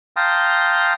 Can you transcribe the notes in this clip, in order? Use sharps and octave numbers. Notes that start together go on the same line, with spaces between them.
F5 G5 A5 A#5 C6 D#6